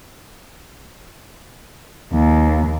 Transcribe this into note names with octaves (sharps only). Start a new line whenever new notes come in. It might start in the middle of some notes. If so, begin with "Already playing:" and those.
D#2